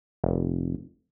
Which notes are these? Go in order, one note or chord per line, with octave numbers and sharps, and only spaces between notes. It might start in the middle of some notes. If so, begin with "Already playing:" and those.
F1